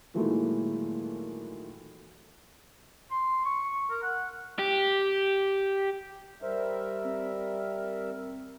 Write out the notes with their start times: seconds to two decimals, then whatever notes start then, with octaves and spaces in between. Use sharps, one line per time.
0.14 A#2 D#3 E3 F#3 G#3 A3
3.11 C6
3.45 C#6
3.90 A#4
4.02 F#5
4.59 G4
6.42 G3 A#4 C5 E5
7.05 C4